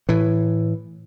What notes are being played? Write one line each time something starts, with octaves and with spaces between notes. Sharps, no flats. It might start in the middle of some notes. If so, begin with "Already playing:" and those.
A2 E3